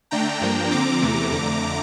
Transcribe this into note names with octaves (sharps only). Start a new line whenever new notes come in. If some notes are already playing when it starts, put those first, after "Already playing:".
D3 A3 D4 G5 A#5
G2 F3 A#3 D4
D3 F3 C4 A#5 D6
E2 C3 E3 A3
F2 D3 A3